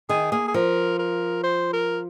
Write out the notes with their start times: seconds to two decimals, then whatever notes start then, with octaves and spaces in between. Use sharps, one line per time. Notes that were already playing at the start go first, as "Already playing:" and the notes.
0.09 D#3 G#4
0.32 A#3 G#4
0.48 G#4
0.54 F3 A#4
0.99 A#4
1.44 C5
1.73 A#4